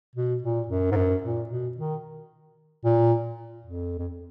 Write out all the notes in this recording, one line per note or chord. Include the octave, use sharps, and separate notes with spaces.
B2
A#2
F#2
G#2
F#2
A#2
B2
D#3
A#2
F2
F2